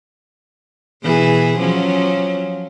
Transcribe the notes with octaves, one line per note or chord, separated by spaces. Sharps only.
B2 E3 G#4
F3 F#3 C#4